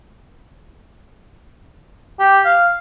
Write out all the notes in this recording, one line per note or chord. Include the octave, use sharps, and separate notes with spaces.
G4
F5